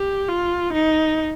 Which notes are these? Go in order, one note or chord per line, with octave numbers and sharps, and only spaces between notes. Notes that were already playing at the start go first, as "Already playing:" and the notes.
Already playing: G4
F4
D#4